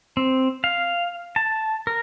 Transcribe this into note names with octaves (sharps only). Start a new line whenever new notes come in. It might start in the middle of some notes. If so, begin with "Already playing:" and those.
C4
F5
A5
A#4